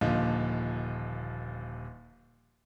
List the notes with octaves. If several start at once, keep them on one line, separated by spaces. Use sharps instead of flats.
D#1 A#2 D3 F3 D#4